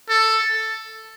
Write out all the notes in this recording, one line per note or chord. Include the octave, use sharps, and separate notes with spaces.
A4